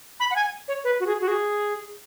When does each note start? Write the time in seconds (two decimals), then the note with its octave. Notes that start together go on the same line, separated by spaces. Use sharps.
0.20 B5
0.31 F#5
0.36 G#5
0.68 C#5
0.84 B4
1.00 F#4
1.07 G#4
1.21 F#4
1.28 G#4